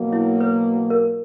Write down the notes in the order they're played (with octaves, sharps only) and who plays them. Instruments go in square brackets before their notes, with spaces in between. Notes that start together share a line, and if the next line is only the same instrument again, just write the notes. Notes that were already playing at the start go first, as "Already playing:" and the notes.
Already playing: [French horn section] B2 F#3 A#3
[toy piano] E4
B4
A#4